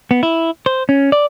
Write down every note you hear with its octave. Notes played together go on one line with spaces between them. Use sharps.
B3
E4
C5
C#4
D5